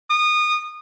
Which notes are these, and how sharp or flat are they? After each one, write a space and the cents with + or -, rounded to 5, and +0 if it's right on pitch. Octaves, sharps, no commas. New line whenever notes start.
D#6 -25